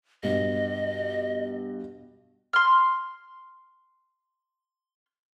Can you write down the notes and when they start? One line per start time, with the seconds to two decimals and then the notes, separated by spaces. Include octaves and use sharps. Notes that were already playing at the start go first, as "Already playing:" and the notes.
0.23 G2 B2 D#5
2.53 C6 F6